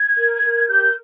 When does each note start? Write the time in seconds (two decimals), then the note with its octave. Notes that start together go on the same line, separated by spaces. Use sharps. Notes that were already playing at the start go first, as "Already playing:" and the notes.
Already playing: G#6
0.18 A#4
0.43 A#4
0.68 G4 G6